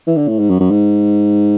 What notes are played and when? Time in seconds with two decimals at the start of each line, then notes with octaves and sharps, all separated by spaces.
0.07 E3
0.17 D3
0.28 A2
0.39 G#2
0.50 F#2
0.60 F#2
0.70 G#2